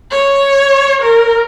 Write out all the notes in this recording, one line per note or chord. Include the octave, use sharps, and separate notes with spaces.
C#5
A#4